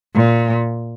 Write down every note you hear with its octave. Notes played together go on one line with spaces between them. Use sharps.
A#2